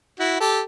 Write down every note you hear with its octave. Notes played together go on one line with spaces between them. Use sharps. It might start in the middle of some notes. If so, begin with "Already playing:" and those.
E4 F#4
G4 A4